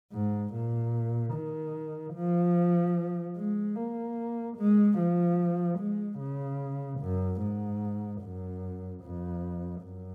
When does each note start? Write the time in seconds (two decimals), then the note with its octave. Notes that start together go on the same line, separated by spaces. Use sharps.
0.13 G#2
0.53 A#2
1.34 D#3
2.14 F3
3.36 G#3
3.76 A#3
4.57 G#3
4.98 F3
5.79 G#3
6.19 C#3
7.00 F#2
7.41 G#2
8.21 F#2
9.03 F2
9.83 F#2